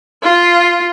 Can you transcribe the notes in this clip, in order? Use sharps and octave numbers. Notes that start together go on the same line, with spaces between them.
F4